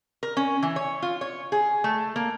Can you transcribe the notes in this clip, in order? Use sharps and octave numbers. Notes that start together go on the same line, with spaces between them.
A#4
C#4
E3
C#5
F4
C#5
G#4
A3
A#3